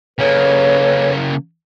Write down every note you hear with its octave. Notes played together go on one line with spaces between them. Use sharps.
C#3 A#3 A4 B4 C#5